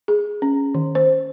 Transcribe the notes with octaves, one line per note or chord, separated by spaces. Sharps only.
G#4
C#4
D#3
C5